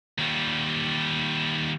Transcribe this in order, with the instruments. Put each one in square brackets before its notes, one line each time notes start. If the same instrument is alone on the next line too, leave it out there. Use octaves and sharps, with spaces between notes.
[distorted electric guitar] D#2 G3